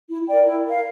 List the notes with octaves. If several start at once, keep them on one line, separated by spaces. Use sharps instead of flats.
E4
A#4 D5 G5
E4
A#4 F5